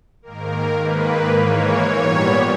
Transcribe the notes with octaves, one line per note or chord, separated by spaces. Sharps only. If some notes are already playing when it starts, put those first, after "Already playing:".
G#2 D#3 A#3 A#4
G#2 D#3 A#3 B4
G#2 E3 A#3 C#5
A#2 G3 B3